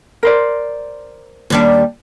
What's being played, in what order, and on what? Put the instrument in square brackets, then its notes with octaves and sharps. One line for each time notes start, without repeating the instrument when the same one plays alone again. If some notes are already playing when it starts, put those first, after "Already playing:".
[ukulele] A#4 C5 D5
[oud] D#2 G3 D4